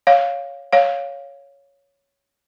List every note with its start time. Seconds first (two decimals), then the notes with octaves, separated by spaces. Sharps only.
0.07 C#5 F5
0.73 C#5 F5